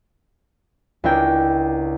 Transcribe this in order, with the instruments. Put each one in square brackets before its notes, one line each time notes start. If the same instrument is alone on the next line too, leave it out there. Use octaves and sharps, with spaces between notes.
[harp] C#2 C#3 D4 E4 A#4 G5